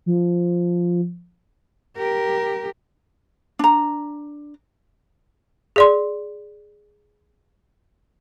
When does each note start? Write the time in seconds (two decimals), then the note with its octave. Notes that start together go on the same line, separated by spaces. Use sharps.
0.06 F3
1.97 G4 A#4
3.59 D4 A#5
5.76 G#4 D5 C6